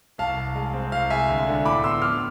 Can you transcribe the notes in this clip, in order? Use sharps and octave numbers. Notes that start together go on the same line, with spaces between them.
C2 F5 A5
C2
G#3
C4
C2 F5
G#3 E5 G#5
D2
D3
A2 B5 D6
B3 C6 E6
F3 D6 F6